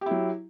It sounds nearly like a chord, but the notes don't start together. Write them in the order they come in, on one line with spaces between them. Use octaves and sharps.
G4 E4 F#3